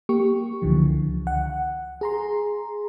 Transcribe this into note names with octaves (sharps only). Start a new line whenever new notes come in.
A#3 G4 C#6
C#2 D3 E3 F3
F#5
G#4 A#5 C6